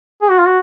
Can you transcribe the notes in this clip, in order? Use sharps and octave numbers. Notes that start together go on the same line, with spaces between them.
G#4
F#4
F4
F#4